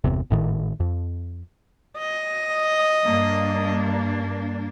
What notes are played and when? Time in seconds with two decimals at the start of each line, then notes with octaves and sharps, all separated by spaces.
0.04 G1 E2 C3
0.31 G#1 A2 D#3
0.80 F2
1.98 D#5
3.07 G2 A#3 D4